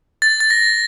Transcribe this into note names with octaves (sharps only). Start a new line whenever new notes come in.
A6
A6
A#6